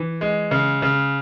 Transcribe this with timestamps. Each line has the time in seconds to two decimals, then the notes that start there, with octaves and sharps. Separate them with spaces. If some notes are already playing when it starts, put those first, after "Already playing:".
Already playing: E3
0.21 G#3
0.51 C#3
0.82 C#3